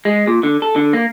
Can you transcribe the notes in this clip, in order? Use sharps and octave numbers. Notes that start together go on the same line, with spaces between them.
G#3
A#2
D3
A4
D3
A#3